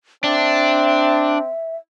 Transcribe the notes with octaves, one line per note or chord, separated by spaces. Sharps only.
C4 D4 E5